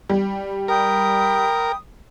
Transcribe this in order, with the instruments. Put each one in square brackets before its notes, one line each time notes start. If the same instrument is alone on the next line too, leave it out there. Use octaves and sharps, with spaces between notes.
[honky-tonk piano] G3
[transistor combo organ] A#4 [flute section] G5 B5 D#6